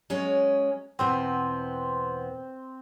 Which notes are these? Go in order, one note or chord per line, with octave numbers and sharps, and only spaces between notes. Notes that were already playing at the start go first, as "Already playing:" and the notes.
F#3 G#3 C#4
E2 B2 B3 C4